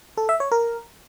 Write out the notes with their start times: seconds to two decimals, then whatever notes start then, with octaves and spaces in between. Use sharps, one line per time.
0.17 A4
0.29 E5
0.40 C#5
0.52 A#4